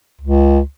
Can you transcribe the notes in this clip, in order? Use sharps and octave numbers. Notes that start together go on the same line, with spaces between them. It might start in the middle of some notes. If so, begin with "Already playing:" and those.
C#2